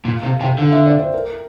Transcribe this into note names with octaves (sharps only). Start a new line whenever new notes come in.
A#2 F5
C3 F5
C3 G5
D3 F5
E5
D5
C5
A#4